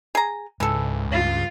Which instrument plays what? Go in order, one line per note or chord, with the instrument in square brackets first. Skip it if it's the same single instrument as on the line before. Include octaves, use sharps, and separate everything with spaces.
[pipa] G#4 A#5
[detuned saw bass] C#2 [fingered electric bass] G#2 [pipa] E3 A4
[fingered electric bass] G2 [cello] F4